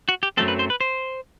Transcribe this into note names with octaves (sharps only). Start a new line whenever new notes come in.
F#4
G4
F#2 F#3 A3 C4 A4
B4
C5
B4
C5